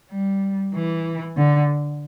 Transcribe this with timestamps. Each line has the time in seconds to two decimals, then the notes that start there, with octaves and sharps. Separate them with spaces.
0.11 G3
0.74 E3
1.37 D3